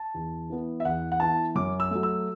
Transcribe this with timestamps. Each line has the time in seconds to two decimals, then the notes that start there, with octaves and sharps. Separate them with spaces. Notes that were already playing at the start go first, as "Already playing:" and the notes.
Already playing: A5
0.14 E2
0.50 E3 B3
0.80 E5
0.85 E2 F#5
1.12 F#5
1.20 E3 B3 A5
1.55 F#2 D6
1.80 E6
1.91 F#3 A3
2.03 E6